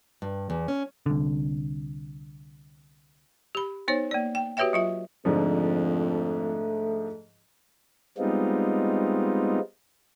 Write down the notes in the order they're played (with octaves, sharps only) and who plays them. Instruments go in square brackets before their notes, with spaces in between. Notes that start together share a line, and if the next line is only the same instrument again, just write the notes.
[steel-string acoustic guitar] G2
E2
C#4
[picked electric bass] C2 D3
[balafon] G4 B5
B3 D#4 C5 C#5
A#3 D5
G5
F#4 G4 B4 C#5 E5 G5
F#3 F4 E5
[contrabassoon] F2 [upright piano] G#2 D3 F3 [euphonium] A3
[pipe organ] G3 G#3 B3 C4 D#4 F4